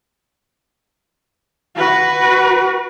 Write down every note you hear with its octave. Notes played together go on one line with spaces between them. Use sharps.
F#4 B4